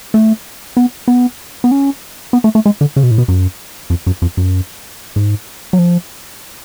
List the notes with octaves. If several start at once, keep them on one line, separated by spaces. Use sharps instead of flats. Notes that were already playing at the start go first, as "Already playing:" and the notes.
A3
B3
B3
B3
C#4
B3
A3
A3
G#3
D3
C#3
B2
A2
B2
F#2
F2
F#2
F2
F#2
G#2
F#3
F3